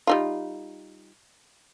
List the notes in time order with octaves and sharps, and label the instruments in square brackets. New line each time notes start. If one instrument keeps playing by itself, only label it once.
[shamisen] G3 D#4 F4